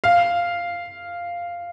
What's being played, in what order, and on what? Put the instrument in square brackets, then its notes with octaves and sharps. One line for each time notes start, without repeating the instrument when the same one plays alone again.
[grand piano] F5